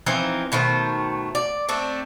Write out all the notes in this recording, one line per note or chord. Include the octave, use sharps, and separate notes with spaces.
E3 F3 C4 D#4
B2 D#3 A3 C5
D5
A3 C4 D4